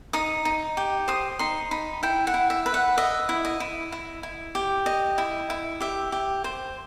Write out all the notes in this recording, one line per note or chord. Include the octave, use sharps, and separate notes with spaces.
D#4 D#6
D#4
G4
C5 D#6
D#4 C6
D#4 B5
E4 G5
F#5
E4
E5
B4
F#5
D#5 E5
E4
D#5
E4
E4
E4
G4
D#5
E4
E4
G4 E5
G4
C5